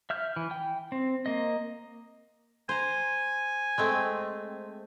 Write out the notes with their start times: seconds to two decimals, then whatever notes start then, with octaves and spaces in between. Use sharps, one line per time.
0.10 E5 F6 G6
0.36 E3
0.51 G5
0.92 C4
1.26 A#3 D#5
2.69 C5 G#5 A#5
3.78 G#3 A3 C4